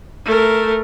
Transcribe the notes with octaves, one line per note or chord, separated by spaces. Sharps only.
A3 A#4